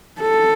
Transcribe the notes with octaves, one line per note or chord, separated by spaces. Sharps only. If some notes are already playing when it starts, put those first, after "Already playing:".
A4